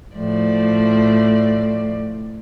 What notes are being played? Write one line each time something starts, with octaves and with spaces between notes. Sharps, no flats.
A2 F3 D5